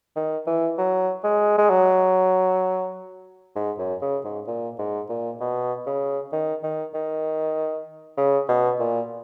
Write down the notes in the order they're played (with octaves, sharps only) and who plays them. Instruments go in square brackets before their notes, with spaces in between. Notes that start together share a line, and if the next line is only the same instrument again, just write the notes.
[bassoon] D#3
E3
F#3
G#3
G#3
F#3
G#2
F#2
C#3
G#2
A#2
G#2
A#2
B2
C#3
D#3
D#3
D#3
C#3
B2
A#2